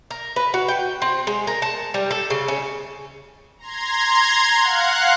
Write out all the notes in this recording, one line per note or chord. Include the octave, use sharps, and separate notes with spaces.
A#4
B4
F#4
G5
C4
G#3
A#4
A5
G3
A4
C#3
C#4
A#5 C6 G#6
F5 F#5 F#6